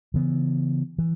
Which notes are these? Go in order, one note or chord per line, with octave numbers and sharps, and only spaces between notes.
C#3 E3 B3
E3